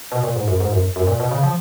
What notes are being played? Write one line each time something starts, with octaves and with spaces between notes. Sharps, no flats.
B2
A#2
G#2
F#2
G#2
F#2
F#2
A#2
B2
C#3
F3